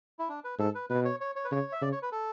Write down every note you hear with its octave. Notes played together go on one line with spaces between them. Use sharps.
E4
D4
B4
G#2 A4
B4
B2 B4
C#5
C#5
C#5
B4
C#3 C#5
E5
C#3 D5
C#5
B4
A4